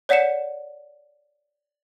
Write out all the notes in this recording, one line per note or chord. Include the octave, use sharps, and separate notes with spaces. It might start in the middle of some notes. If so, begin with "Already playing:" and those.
C#5 D5 F#5 B6 C#7 E7